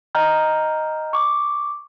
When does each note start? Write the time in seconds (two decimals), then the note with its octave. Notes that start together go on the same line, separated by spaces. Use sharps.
0.15 D#5 G5 A#5 F6 G6
1.13 C#6 D6